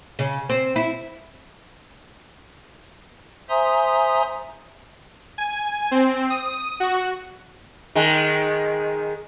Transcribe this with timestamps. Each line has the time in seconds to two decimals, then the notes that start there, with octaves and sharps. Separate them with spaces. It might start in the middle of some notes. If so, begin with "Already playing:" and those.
0.19 C#3
0.49 C4
0.76 E4
3.49 C5 E5 G#5 A#5 C6 D#6
5.38 G#5
5.91 C4
6.30 D#6
6.80 F#4
7.95 D#3 G#3